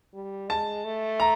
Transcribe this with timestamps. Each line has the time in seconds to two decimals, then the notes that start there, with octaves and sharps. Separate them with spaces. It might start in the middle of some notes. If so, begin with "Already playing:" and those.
0.14 G3
0.49 G#3 A5
0.85 A3
1.20 A#5